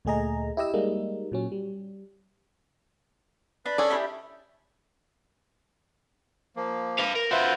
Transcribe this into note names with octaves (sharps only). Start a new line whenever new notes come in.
D2 A#2 A3 G#4 D#5 A#5
E4 G4 D#5 E6
G3 G#3 A#3 D#4
A#2 F#3 C#4
G3
D4 B4
C#4 G#4 A4 D5
D4 E4 G4
F3 A#3
B4 F5
A#4
F4 F#4 B4 C5 E5